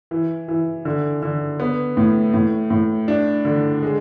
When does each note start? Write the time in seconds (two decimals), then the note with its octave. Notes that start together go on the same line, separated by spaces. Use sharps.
0.11 E3
0.48 E3
0.85 D3
1.23 D3
1.60 B3
1.97 A2
2.34 A2
2.70 A2
3.08 D4
3.45 D3
3.83 G#3